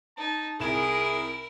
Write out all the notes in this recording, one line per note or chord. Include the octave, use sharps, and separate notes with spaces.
D#4 A5
C2 E4 G#4 A#4 E7